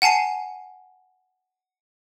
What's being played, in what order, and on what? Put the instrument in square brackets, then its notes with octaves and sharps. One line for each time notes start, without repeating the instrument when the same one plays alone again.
[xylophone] F#5 G#5 A5 C7 D#7